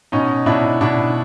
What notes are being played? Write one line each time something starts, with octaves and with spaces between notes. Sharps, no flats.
B2 C#4 D#4
B2 D4 E4
B2 D4 E4